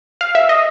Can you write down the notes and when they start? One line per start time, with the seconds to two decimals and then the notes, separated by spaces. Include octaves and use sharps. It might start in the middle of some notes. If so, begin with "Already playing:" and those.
0.21 F5
0.35 E5
0.49 D#5